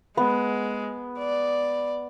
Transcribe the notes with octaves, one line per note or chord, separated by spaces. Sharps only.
G#3 B3
D5